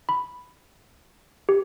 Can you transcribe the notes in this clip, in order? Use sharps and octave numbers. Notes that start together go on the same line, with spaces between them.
B5
G4